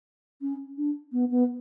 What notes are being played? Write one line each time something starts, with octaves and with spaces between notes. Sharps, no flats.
C#4
D4
B3
B3